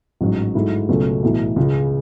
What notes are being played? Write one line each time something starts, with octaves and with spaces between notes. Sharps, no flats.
A1 G#2 F#3
G#2 F#3 A3 E4
C#2 B2 F#3 A3 C#4
B1 A2 E3
C#2 C#3 G#3